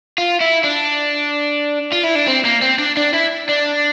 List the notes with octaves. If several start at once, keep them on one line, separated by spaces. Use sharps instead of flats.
F4
E4
D4
F4
E4
D4
C4
A#3
C4
D4
D4
E4
D4